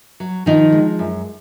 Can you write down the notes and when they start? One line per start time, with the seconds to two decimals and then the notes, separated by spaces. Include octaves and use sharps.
0.20 F#3
0.46 D#3 F3 D#4
0.72 G#3
0.99 F#2